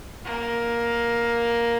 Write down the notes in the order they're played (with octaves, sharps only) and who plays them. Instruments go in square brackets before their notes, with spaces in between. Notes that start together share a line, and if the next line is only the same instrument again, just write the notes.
[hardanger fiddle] A#3